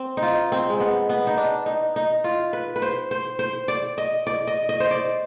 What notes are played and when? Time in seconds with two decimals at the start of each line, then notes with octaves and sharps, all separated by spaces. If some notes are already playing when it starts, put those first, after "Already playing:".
Already playing: C4
0.17 D#4
0.22 F4
0.52 C4
0.70 G#3
0.80 B3
1.09 B3
1.27 D#4
1.37 D4
1.66 D#4
1.96 D#4
2.24 F4
2.53 B4
2.76 B4
2.82 C5
3.11 C5
3.39 C5
3.68 D5
3.98 D#5
4.27 D5
4.47 D#5
4.69 D#5
4.80 C5
4.91 D5